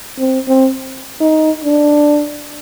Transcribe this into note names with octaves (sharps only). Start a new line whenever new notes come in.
C4
C4
D#4
D4